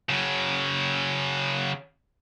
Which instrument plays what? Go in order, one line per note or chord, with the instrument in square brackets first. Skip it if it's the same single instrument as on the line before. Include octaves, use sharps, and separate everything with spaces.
[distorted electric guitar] C#3 F#3